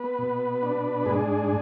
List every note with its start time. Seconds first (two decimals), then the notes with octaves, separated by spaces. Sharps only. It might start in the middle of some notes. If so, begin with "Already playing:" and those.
Already playing: B3 B4
0.18 B2
0.63 D4
1.06 G#2 G#4